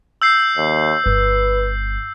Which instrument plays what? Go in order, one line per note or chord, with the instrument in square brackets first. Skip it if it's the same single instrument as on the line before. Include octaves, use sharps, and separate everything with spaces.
[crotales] E6 G6 C7
[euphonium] D#2
[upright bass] G1 [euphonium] B4